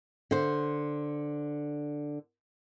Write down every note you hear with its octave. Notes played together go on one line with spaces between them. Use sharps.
D3 C5